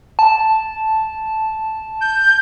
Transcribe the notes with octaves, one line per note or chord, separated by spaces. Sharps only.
A5
G6